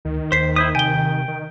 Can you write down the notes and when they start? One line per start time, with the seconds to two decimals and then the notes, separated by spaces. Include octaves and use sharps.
0.05 D2 D#3
0.32 D#2 C5 B6 C7
0.56 E4 C5 D#6 B6
0.75 C3 G5 G#5 G7
1.28 D#3